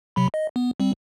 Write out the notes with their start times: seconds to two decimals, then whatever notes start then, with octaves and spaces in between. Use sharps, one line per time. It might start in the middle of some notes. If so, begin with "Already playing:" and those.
0.16 C3 F#3 B5
0.34 D#5
0.56 B3
0.80 G3 C4